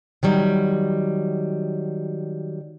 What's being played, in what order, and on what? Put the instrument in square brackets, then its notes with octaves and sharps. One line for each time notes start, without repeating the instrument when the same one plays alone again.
[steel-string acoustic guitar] D#3 F#3 G3